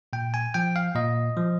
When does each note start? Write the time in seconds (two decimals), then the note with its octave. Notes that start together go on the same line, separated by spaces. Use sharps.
0.13 A#2 G5
0.34 G#5
0.54 F3 G5
0.76 F5
0.95 A#2 D#5
1.37 F3